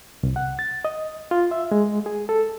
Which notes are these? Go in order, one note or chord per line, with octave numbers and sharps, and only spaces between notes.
C2
F#5
A6
D#5
F4
E5
G#3
G#4
A4